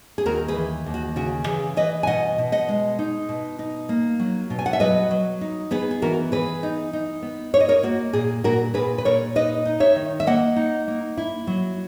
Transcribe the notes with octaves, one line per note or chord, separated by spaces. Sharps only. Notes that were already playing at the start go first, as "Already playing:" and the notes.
G#4
D#2 F#4 A#4
G#4 B4
E3
D#2
F#4
C#3 F#4
E3 G#4
E3 B4 D#5
G#5
B2 D#5 F#5
B2
D#5 F#5
G#3
D#4
B2
D#4
A#3
F#3
B2
G#5
F#5
E5
F#3 B4 D#5
F#3
D#4
B3 G#4 B4
G#4
E3 F#4 A#4
E3 G#4 B4
D#4
D#4
B3
E4 C#5
D#5
A#4 C#5
A#3 F#4
A#2 G#4
A#2 F#4 A#4
A#2 G#4 B4
B4
A#2 A#4 C#5
D#4 B4 D#5
D#4
C#5 E5
D#3
E5
A#3 D#5 F#5
D#4
A#3
E4
F#3